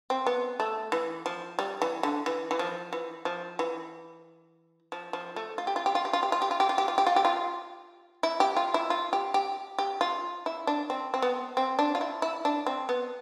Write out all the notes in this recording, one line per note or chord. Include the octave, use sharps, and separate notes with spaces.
C4
B3
A3
E3
F3
G3
E3
D3
E3
E3
F3
E3
F3
E3
F3
F3
A3
F4
G4
F4
G4
F4
G4
F4
G4
F4
G4
F4
G4
F4
G4
F4
G4
F4
G4
F4
E4
G4
F4
E4
F4
G4
G4
G4
F4
E4
D4
C4
C4
B3
C4
D4
F4
E4
E4
D4
C4
B3